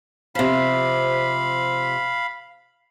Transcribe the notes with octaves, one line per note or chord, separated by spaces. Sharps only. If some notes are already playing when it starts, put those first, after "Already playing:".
C3 F3 F5 B5